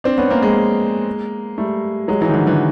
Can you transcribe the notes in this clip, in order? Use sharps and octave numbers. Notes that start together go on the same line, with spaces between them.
C4 D4
B3 C#4
A#3 C4
G#3 A#3
G3 A3
F#3 G#3
E3 F#3
D#3
D3 E3
D3 E3